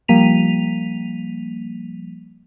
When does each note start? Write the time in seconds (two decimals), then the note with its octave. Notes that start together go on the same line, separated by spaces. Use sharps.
0.08 F3 G3 A#3 B6 D#7 F7